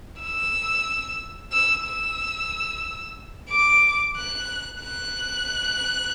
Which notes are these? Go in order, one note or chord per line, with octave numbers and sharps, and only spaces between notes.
E6
E6
E6
D6
F#6
F#6